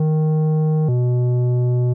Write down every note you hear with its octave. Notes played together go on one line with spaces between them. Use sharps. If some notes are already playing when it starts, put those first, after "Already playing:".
Already playing: D#3
B2